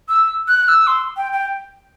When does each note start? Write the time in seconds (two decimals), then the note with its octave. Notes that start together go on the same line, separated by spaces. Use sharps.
0.09 E6
0.48 F#6
0.68 E6
0.87 C6
1.17 G5
1.32 G5